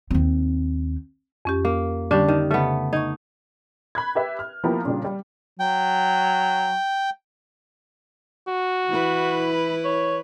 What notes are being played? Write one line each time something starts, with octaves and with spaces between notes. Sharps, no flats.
D#2 C4
F2 C#4 G4
A#3
D3 G3 C#4 D4 G4
D#3
C#3 A3 B3
D#4 C#6 G#6
B5 F#6 G#6
G4 B4 E5
F6
F3 A#3 B3 E4 G4 A#4
A#2 C#3 G3 D4 G4
G3
F#3 G5
F#4
E3 E4 B4
C#5